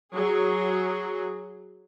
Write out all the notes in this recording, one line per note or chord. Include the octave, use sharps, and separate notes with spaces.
F#3 G#4